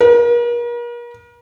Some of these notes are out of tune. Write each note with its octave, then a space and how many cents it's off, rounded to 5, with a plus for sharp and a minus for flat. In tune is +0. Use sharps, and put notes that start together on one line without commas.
A#4 +40